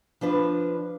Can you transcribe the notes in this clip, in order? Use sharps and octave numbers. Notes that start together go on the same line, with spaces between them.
F3 D4 B4